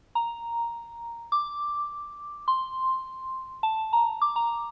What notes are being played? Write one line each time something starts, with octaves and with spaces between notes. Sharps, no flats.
A#5
D6
C6
A5
A#5
D6
A#5